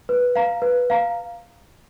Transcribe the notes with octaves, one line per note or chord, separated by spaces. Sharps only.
B4
F5 A#5
B4
F5 A#5